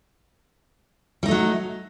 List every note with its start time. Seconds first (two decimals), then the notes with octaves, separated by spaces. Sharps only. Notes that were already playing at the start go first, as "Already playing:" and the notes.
1.23 G3
1.26 D#4
1.28 A3
1.31 F#3